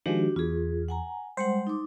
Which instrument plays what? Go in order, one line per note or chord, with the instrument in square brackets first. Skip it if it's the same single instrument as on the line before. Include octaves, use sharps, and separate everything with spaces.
[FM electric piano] D#3 F3 G#3 [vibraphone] D4 F#4 G4
[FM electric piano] E2 [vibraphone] F4 G#4
[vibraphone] F#5 G#5 A#5
[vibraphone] G3 G#3 F#5 [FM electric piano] C5
[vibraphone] D#4 D6